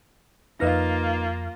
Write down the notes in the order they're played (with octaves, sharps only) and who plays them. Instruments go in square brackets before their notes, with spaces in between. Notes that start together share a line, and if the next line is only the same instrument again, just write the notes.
[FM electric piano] F2 F6 A#6 [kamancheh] A#3 F4 [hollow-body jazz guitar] D#4 B4 D#5